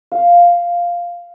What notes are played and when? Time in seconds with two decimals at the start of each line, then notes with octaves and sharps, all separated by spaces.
0.12 F5